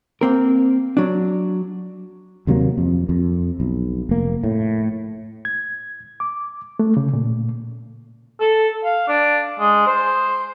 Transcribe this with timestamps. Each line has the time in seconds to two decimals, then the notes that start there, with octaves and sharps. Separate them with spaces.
0.21 A#3 C4 A#4
0.97 F#3 D4
2.47 D#2 C3 F#3 A#3
2.78 F2
3.09 F2
3.60 B1
4.09 F1 A#3
4.44 A2
5.45 G#6
6.20 D6
6.79 A3
6.97 C#3
7.13 A#2
8.40 A4
8.84 F5
9.08 D4
9.59 G#3
9.87 C5